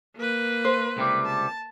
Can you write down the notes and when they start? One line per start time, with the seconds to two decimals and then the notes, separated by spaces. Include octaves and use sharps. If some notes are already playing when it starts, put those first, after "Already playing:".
0.16 A#3 B4
0.65 C5
0.97 C#2 C3 G3
1.26 A5